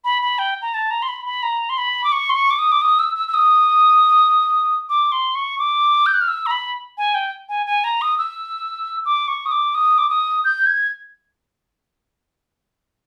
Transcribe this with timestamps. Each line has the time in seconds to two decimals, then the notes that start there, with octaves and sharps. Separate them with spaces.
0.04 B5
0.22 B5
0.39 G5
0.62 A#5
0.74 A5
0.91 A#5
1.02 C6
1.09 B5
1.26 B5
1.43 A#5
1.69 C6
1.78 B5
2.04 D6
2.12 C#6
2.30 C6
2.35 C#6
2.50 D6
2.59 D#6
2.72 D6
2.82 D#6
2.99 E6
3.16 E6
3.28 E6
3.34 D#6
4.89 D6
5.12 C6
5.35 C#6
5.59 D6
6.06 G6
6.14 F#6
6.21 F6
6.28 E6
6.46 A#5
6.51 B5
6.98 G#5
7.15 G5
7.49 G#5
7.67 G#5
7.84 A#5
8.02 D#6
8.18 E6
9.06 D6
9.28 C#6
9.46 D#6
9.51 D6
9.75 D#6
9.98 D6
10.10 D#6
10.44 G6
10.66 G#6